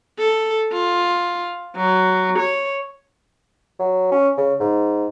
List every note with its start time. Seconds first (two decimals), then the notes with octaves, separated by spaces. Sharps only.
0.18 A4
0.72 F4
1.76 F#3
2.39 C#5
3.79 F#3
4.12 C#4
4.37 C#3
4.60 G#2